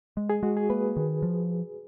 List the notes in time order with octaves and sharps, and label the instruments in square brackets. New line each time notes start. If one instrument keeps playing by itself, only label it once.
[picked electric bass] G#3
[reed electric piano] G#4
[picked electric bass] G#3 [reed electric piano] F#4
[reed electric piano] G#4
[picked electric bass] A#3 [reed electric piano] B4
[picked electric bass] D#3
F3